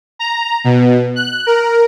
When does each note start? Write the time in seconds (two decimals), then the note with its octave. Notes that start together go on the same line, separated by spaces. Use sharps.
0.19 A#5
0.64 B2
1.16 F#6
1.47 A#4